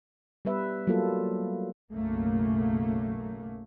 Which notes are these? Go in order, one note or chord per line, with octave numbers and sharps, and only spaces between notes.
G3 B3 B4 E5
F#3 G3 A#3 F4 A4
B1 F#2 C#3 A3 A#3